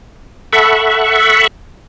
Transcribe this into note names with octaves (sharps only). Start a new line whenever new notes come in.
A4 E5 F#5 B5 C#6